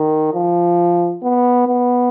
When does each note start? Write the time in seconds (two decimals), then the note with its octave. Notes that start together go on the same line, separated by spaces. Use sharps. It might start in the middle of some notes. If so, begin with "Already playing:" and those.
Already playing: D#3
0.34 F3
1.23 B3
1.67 B3